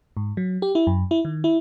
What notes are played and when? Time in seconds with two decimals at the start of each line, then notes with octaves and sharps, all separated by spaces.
0.17 G#2
0.37 F#3
0.62 G4
0.75 E4
0.87 F#2
1.11 E4
1.25 D#3
1.44 E4